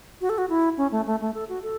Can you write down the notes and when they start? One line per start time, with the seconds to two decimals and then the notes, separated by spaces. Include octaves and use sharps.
0.21 F#4
0.29 A4
0.38 F#4
0.49 E4
0.77 C#4
0.92 A3
1.06 A3
1.21 A3
1.34 A4
1.49 F#4
1.63 A4